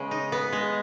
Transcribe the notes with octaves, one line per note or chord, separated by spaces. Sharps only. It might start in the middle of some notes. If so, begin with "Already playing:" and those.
Already playing: C#3 G#3 B3
D#4
B3
G#3